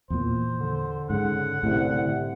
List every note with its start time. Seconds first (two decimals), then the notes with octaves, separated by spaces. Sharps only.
0.10 E2 A#2 C5
0.60 D3
1.10 G#2 C#3 F#5
1.63 C2 A2